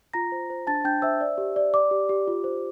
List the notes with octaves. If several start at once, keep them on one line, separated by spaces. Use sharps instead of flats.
F4 A#5 A#6
C5
C5
D4 A5 A6
D4 G5 G6
C5 E5 E6
D5
G4
D5
D5 D6
G4
G4
F4
C5